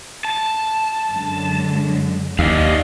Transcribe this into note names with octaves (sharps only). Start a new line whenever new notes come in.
A5
F#2 D3 G#3
D#2 D5 D#5 F5